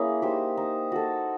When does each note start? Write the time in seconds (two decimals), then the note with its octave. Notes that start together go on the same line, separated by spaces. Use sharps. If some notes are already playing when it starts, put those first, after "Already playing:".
Already playing: A#3 C#4 E4 G#4 C#5
0.22 D#4 G4 C5
0.57 D#4
0.92 F#4 A4